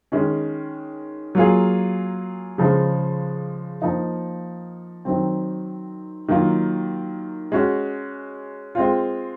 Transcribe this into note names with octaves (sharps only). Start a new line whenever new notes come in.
D#3 G#3 C#4
F#3 A#3 F4 G#4
C#3 F3 G#3
F3 A#3 D#4
D#3 F#3 C4
D#3 F#3 A#3 F4 A#4
G#3 C#4 F#4
G#3 C4 F4